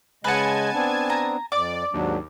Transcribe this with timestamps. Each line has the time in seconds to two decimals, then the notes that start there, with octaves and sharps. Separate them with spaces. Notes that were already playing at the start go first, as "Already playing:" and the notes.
0.24 C#3 G#3 B4 D#5 F#5 G#5 A5 G#6
0.73 B3 C4 D4
1.10 A#5
1.52 F2 D5 D6
1.93 D#2 G#2 F#3 D4